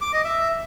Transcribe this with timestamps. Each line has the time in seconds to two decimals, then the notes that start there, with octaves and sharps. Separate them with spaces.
0.01 D6
0.13 D#5
0.25 E5